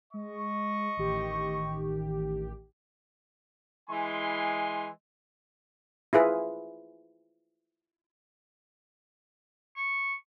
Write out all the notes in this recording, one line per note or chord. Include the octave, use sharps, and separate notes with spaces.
G#3 D#5 C#6
A1 D#3 G4
E3 G#3 E4 G#5 C6
E4 F4 G#4 B4
C#6